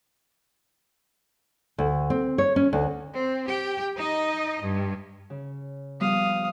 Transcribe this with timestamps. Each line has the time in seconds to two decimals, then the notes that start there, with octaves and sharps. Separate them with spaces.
1.78 D2
2.10 C4
2.38 C#5
2.56 C#4
2.73 D2
3.13 C4
3.48 G4 G5
3.96 D#4 D#5
4.62 G2
5.30 C#3
6.00 F3 G3 B3 F5 D#6